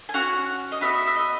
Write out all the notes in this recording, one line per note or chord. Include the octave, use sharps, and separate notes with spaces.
G#5
C#4 F#4 F#5
D#5
B3 F#4 E5
E5
D#5